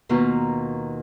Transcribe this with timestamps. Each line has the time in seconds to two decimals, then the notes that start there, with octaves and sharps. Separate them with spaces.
0.09 D#2 B2 F4 B4 A#5